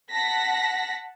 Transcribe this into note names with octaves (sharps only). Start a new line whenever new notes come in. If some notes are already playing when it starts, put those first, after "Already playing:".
F#5 A5 A#6 B6